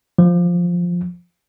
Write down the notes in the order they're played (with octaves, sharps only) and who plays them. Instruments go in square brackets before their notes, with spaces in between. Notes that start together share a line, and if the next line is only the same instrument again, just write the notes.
[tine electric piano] F3